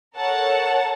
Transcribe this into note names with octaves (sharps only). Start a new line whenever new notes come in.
A4 A#4 C#5 F#5 A5